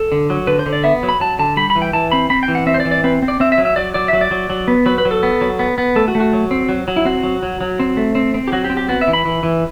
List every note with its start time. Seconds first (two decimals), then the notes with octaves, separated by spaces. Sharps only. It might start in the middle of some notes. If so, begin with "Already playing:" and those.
Already playing: A4
0.12 D3
0.30 F#3
0.47 D3 B4
0.59 C5
0.66 D3
0.73 D5
0.84 B3 E5
1.03 F#3
1.09 B5
1.20 F#3 A5
1.39 D3 A5
1.57 G3 B5
1.70 B5
1.75 E3
1.82 G5
1.93 E3 A5
2.12 C4 B5
2.30 C4 B5
2.43 G5
2.48 E3
2.55 F#5
2.67 C4 E5
2.74 C5
2.80 D5
2.85 E3
2.91 D5
3.04 C4 B4
3.22 C4
3.28 D5
3.40 C4 E5
3.52 E5
3.58 F#3
3.65 E5
3.76 F#3 D5
3.94 F#3 D5
4.08 F#3 E5
4.21 D5
4.31 F#3
4.50 F#3
4.68 B3
4.86 F#3 B4
4.98 B4
5.05 F#3
5.11 A4
5.23 B3
5.41 F#3
5.59 B3
5.78 B3
5.96 A3 A4
6.08 F#4
6.15 A3
6.20 F#4
6.33 F#3
6.51 C4
6.69 F#3
6.88 F#3
6.96 E4
7.05 C4 F#4
7.23 F#3
7.43 F#3
7.61 F#3
7.79 C4
7.97 A3
8.15 C4
8.34 C4
8.48 G4
8.52 F#3 F#4
8.64 G4
8.70 C4
8.77 G4
8.89 B3 F#4
9.01 E5
9.07 E3
9.13 B5
9.25 E3
9.43 E3